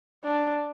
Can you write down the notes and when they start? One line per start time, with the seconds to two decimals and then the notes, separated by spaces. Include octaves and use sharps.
0.24 D4